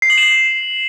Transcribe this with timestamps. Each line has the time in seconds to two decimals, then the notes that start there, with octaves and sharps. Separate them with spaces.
0.02 C7
0.10 F#7
0.18 E7
0.25 F#7